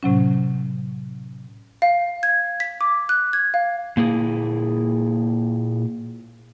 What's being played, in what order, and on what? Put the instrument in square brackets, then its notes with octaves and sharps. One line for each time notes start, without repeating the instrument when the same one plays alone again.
[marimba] A2 C3 F#3 C#4
[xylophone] F5
G#6
B6
D6
F#6
G#6
F5
[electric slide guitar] A#2 A#3 E4 G#4